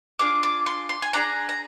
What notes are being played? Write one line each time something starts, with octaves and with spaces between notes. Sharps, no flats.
D4 F4 G#4 D6
D6
C6
C6
G#5
D4 F4 G#4 A#5
A#5